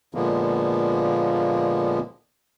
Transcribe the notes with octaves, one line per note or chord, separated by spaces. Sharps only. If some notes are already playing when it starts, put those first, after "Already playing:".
A#2 D3 F3 G#3 A#3 B3